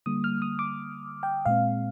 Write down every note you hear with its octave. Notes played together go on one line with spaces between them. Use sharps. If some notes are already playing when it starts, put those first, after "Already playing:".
D3 G3 A#3 D#6
F6
D#6
D6
G5
A#2 G#3 C4 F5